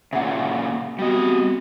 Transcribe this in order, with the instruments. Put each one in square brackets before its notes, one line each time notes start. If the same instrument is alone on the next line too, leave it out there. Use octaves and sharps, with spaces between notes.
[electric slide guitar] A#2 C#3 [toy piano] E5 F#5
[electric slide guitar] G3 D#5 [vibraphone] B3 C4 [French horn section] F#4